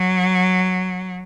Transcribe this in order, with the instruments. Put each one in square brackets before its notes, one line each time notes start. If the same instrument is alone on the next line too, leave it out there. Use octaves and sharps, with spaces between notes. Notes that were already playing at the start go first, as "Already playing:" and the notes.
Already playing: [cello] F#3